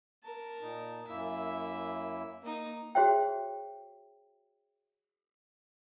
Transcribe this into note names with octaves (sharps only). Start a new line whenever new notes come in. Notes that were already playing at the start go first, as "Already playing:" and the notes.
A#4 A5
A#2 D#4
F#2 A#3 E4 E5
A#3 D#4
F#4 G#4 C5 C#5 E5 G5